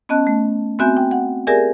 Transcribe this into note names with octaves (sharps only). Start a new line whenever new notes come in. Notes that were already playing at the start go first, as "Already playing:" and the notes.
B3 C#4 D#5 A5 F#6
A3
B3 C4 F#4 E5 G#5 G6
G5
F#5
G4 G#4 A#4 D5 E5 G#5